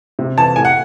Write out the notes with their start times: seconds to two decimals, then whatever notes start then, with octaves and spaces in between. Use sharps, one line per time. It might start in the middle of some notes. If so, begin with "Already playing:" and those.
0.19 C3
0.38 E3 A5
0.56 A2 G#5
0.65 F#5